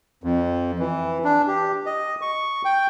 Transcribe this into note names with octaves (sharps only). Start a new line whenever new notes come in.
F2
E3
D4
G4
D#5
C#6
G5